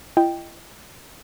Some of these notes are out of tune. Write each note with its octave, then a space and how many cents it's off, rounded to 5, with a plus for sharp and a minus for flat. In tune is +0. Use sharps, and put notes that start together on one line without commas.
E4 +45 D#5 +0 G5 +0